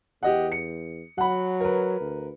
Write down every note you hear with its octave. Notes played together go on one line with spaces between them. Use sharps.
E2 G4 D#5 F#5
C#7
F#3 F#5 B5
A#4 B4
D2